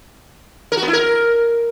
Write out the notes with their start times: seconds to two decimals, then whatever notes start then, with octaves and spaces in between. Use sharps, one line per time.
0.72 A#4
0.77 F#4
0.83 B3
0.88 E4
0.93 A#4